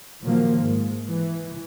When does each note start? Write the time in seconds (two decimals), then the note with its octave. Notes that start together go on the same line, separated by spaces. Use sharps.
0.23 A#2 D#3 F3 F#3 A#3
0.60 G#2 G#3
1.10 E3